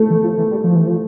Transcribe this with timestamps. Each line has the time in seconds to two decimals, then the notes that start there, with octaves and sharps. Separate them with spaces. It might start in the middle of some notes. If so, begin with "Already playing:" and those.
Already playing: A3
0.11 E3
0.24 F3
0.38 E3
0.51 G3
0.64 F3
0.75 E3
0.87 F3